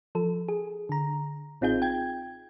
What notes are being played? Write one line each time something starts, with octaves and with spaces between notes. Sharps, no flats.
F3 A4
G#4
D3 A#5
A1 C4 D#4 F4 G#4 G6
G5 G#6